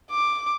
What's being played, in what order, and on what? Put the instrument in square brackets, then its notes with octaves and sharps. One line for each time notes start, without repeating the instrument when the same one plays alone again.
[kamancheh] D6